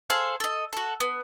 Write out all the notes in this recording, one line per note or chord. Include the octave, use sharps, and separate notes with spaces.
G#4 A4 C5 F5
A4 D#5
F#4 A4
B3